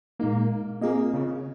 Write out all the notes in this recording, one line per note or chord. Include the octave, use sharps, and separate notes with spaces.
A#2 G#3 A#3 D#4
A#3 C4 F4 G#4 D#5
C#3